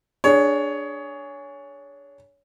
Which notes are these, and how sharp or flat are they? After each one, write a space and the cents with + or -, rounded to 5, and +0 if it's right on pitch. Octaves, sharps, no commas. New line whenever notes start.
D4 +0 G#4 +0 C#5 +20